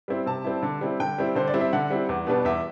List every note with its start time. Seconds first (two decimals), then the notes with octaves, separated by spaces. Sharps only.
0.08 G3 C4 E4
0.26 C3 A5
0.44 G3 C4 E4
0.63 D3
0.81 G3 C4 E4
1.00 D3 G5
1.18 G3 C4 E4
1.35 D3 C5
1.47 D5
1.54 G3 C4 E4
1.61 E5
1.73 D3 F#5
1.90 G3 C4 E4
2.09 E2
2.27 B2 G3 B3 D4
2.45 E2 E5